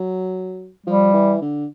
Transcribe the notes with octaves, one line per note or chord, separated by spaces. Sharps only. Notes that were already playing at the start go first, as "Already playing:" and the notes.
Already playing: F#3
F3 G3
E3
D3